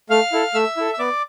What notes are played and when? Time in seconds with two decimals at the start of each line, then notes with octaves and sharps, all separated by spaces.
0.10 A3 F5 F6
0.32 E4 A4
0.54 A3 E5 E6
0.77 E4 A4
0.94 E6
0.99 B3 D5 D6